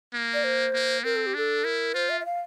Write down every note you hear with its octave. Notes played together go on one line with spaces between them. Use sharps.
A#3
D5
C5
A#3
C4 A#4
A4
G4
D4 A4
E4 A#4
F4 C5
E5
E5
F5